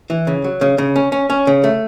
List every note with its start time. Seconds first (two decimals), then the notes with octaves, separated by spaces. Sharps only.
0.10 E3
0.27 C#3
0.44 F#3
0.61 C#3
0.78 C#3
0.96 C#4
1.12 C#4
1.30 C#4
1.47 C#3
1.64 A3